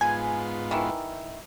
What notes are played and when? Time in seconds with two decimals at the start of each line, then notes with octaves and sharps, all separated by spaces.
0.01 G#2 B3 F4 G#5
0.71 D#3 E3